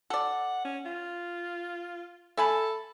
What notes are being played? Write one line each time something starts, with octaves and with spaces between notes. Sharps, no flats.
A4 D5 F#5
C#4
F4
A4 E5 G#5 B5